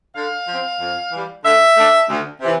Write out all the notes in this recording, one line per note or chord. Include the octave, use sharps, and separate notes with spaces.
D3 F5
F3 C4
F2
E3 G3
D3 E5
A3 D4
D2
C3 E3